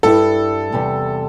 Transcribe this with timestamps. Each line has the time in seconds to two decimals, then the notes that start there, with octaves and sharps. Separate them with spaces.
0.03 G2 G3 E4 A4
0.72 E2 C3 G3